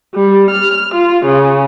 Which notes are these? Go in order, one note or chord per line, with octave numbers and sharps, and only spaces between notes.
G3
F6
F4
C#3